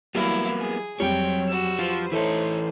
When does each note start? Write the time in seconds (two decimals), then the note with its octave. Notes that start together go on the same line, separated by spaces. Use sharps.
0.15 E3 F#3 G3 A#3 B3 E4 F5
0.59 G#4
1.00 F2 F#3 G3 C4 C#5 G5
1.48 F#4 E6
1.79 F3 F4 B4 C5
2.12 E3 A3 D#4 E4 A4 C#5